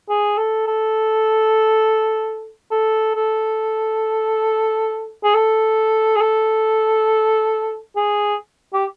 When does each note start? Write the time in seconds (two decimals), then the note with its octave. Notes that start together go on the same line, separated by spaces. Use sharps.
0.09 G#4
0.38 A4
0.67 A4
2.71 A4
3.15 A4
5.24 G#4
5.35 A4
6.16 G#4
6.21 A4
7.96 G#4
8.73 G4